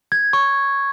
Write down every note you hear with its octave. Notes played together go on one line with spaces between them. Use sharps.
G#6
C#6